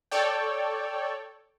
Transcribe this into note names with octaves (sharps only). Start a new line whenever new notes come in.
A4 C#5 D5 G5